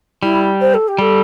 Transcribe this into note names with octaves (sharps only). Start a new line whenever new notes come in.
G3 E4
C5
A4
G4
G3 A4